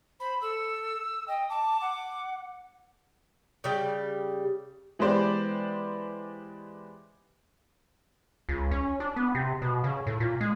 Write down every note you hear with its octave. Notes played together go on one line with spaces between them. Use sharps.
C5 B5
A4 E6
D#5 G5
A5 D6
F#5
C#3 G3 G4
E3 G#3 B3 G4 C5 D5
C#2
C#4
D4
B3
C3
B2
C#3
A2
A#2
G#3